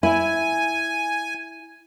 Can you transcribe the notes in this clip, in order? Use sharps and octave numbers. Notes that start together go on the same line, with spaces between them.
E4 G#5